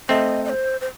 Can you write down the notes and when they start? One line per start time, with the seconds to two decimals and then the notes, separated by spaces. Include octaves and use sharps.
0.09 A3 C4 D#5
0.45 D#5
0.50 C5
0.81 C5